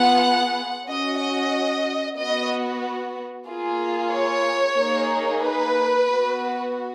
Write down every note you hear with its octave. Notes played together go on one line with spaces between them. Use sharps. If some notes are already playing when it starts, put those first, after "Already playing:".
Already playing: B3 F4 G#4 F#5
C#4 F#4 D#5
D#5
B3 F#4 D#5
A#3 F4 G#4
C#5
A#3 D#4 G#4
B4
B3 F#4